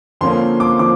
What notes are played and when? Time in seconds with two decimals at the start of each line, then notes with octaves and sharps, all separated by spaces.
0.21 F2 D3 F3 A#3 C#4 C6
0.60 D6
0.79 D3 F3 D6